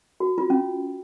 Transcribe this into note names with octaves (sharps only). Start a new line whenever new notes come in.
F#4
F4
C#4